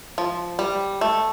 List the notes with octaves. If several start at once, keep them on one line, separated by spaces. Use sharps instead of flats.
F3
G3
A3